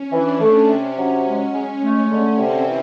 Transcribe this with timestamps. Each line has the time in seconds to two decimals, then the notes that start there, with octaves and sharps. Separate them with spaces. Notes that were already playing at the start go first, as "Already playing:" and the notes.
Already playing: C#4
0.12 E3 D4
0.41 A3
0.69 C3 C#4
0.97 F#3 C#4
1.25 G#3 C#4
1.53 G#3
1.82 A3
2.11 D3
2.38 C3 C4
2.66 E3